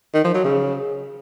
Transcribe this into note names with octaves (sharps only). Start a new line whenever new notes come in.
D#3
F3
F#3
C#3